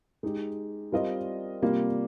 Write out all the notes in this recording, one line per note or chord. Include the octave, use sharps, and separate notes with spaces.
G#3 D#4 G4
G3 C4 F4 A#4 D#5
C3 G3 A#3 F4